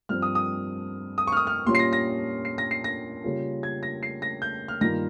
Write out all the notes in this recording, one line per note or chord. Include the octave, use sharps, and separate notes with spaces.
G2 F3 C4 F6
D#6
D#6
D#6
C#6 F6
D#6
F6
A#2 G3 C#4 F4 C6
C7
A#6
A#6
C7
A#6
C7
A#6
C#3 G3 A#3 C#4 F4
G#6
A#6
C7
A#6
G6
F6
G2 D#3 A#3 F4 A#6